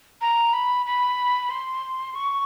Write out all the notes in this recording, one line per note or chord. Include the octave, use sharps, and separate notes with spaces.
A#5
B5
B5
C6
C#6